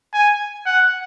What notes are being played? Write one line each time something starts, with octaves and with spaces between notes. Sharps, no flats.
G#5
F#5